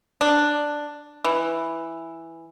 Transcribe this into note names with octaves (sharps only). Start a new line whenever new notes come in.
D4
E3